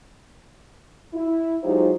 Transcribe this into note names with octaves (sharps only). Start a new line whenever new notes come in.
E4
F#3 G#3 D#4 F4 G4 C5